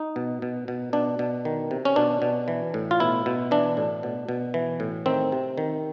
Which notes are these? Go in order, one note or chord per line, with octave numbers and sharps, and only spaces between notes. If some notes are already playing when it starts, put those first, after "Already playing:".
Already playing: D#4
B2
B2
B2
B2 D4
B2
D#3
C3
C#4
B2 D4
B2
E3
A2
F4
B2 E4
B2
E3 D4
A2
B2
B2
E3
A2
D#3 C4
C3
D#3